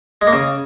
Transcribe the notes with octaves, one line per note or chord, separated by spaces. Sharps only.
G#3
A#3
C#3